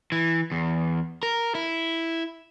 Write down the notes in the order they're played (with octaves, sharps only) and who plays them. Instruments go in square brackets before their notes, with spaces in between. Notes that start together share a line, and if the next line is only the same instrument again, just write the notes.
[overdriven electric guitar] E3
E2
A#4
E4